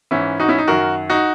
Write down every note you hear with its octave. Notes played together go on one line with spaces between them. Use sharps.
G#2 E3 C#4 E4
D#4 F#4
C#4 E4
D#4
F#2 D#3 F#4 A#4
D#4 F#4